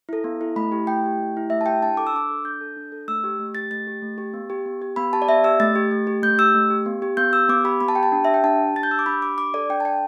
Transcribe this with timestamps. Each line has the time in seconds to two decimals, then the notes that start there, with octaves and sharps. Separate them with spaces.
0.09 E4 A4
0.24 B3
0.41 E4 A4
0.56 A3 B5
0.72 E4 G4
0.87 A3 G5
1.03 E4 G4
1.19 A3
1.35 E4 G4
1.50 A3 E5
1.61 A5
1.66 E4 G4 G5
1.82 D4 A5
1.97 A4 D6
2.07 E6
2.13 D4 D6
2.29 A4
2.44 D4 G6
2.61 A4
2.77 D4
2.92 A4
3.08 A3 E6
3.24 G4
3.39 A3
3.55 G4 A6
3.71 A3 A6
3.87 G4
4.02 A3
4.18 G4
4.34 B3
4.50 G4
4.66 B3
4.82 G4
4.96 B3 B5
5.13 G4 A5
5.22 D5
5.28 B3 E5
5.44 G4 E6
5.60 A3 A6
5.76 G4
5.91 A3
6.07 G4
6.23 A3 G6
6.38 G4 E6
6.55 A3
6.70 G4
6.86 B3
7.02 G4
7.17 B3 G6
7.33 G4 E6
7.49 B3 D6
7.64 G4 B5
7.81 B3 B5
7.88 A5
7.95 G4 G5
8.03 A5
8.12 D4
8.25 G4 E5
8.34 G5
8.44 D4 A5
8.59 G4
8.75 D4 A6
8.83 G6
8.91 G4 E6
8.99 D6
9.06 D4 B5
9.22 G4 D6
9.38 D4 D6
9.54 A4 D5
9.69 D4 G5
9.80 A5
9.85 A4 G5